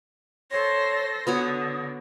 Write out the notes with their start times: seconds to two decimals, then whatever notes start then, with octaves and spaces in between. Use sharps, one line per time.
0.51 A4 C5 C#5 A#6
1.27 D3 B3 F#4 C#5 D#6